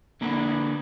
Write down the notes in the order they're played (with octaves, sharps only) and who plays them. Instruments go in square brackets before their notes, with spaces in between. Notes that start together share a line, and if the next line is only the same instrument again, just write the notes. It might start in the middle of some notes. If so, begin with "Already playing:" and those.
[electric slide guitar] D3 A#3 D4 B4